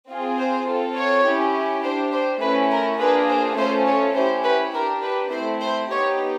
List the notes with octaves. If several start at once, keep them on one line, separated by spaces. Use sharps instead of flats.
C4 F4 G#4
C5
C4 F4 A4
C#5
C#4 E4 G4
D4 G4 C5
C5
A3 C#4 E4 B4
A#4
A#3 D4 F4 G#4 B4
C5
A3 C#4 F4 A4 C5
C#5
C#4 E4 G4 C5
B4
D4 G4 A#4
B4
A3 C4 E4 C5
C5
B3 D#4 G4 C#5